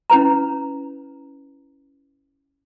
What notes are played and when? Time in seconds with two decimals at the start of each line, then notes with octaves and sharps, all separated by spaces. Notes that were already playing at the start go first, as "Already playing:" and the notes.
0.10 C#4 E4 B4 A#5